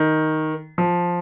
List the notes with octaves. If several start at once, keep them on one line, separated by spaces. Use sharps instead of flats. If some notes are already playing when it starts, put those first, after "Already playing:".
Already playing: D#3
F3